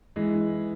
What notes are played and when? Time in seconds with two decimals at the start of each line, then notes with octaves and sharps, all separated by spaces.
0.16 E3 G#3
0.34 E3